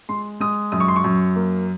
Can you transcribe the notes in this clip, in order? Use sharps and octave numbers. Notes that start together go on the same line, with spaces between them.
G#3 C6
G#3 D#6
F#2 D#6
C#6
C6
C#6
F#2
A#3